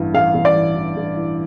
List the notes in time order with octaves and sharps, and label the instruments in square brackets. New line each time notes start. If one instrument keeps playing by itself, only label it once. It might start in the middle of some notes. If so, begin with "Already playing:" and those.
Already playing: [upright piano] A1 G2 E3
[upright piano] A1 [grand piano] F5
[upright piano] A1
[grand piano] D5
[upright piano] E3
E3
A1
E3